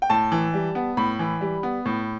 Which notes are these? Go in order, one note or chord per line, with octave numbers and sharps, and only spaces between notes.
G5
A2 A5
E3
G3
B3
A2 B5
E3
G3
B3
A2